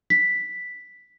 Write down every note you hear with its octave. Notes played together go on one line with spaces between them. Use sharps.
B6